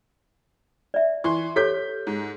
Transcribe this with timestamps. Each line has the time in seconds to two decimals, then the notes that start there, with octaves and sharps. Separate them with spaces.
0.94 D5 E5
1.24 E3 C6 C#6
1.56 G4 A4 C#5 G6 B6
2.07 G#2